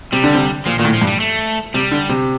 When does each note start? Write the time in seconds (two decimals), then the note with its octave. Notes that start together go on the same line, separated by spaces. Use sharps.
0.12 C3 G3
0.24 D3
0.35 C3
0.66 A#2 F3
0.79 A#2 D#3
0.85 A2
0.93 F3
1.01 G2
1.07 G3
1.20 A3
1.74 C3 G3
1.91 D3
2.09 C3